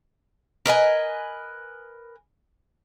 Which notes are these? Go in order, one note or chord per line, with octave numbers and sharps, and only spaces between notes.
A#4 B4 D#5 G#5